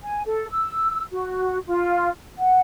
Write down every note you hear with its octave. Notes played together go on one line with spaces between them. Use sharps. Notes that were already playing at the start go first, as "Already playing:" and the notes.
G#5
A4
E6
F#4
F4
F#5